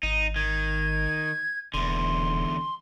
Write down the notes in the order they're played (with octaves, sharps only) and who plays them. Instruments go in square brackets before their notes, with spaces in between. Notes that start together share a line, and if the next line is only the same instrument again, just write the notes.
[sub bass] G#1 [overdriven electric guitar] D#4
[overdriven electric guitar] D#3 [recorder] G#6
[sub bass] E1 [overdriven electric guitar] E2 D3 [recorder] C6